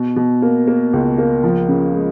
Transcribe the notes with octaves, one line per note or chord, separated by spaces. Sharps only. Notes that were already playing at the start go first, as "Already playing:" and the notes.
Already playing: B2
B2
A#3
A#3
C#2
A#3
F3
C#3
G#3